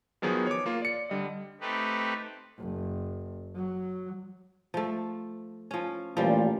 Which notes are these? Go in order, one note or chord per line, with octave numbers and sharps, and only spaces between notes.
D#3 F3 F#3 B3 G#4
C#5 D6
A#3 F4
D5 C#7
D3 G3 D#5
A3 C4 D#4 G4 B4
F#1
F#3
F3 A3
F3 C#4
A1 A#2 F3 G3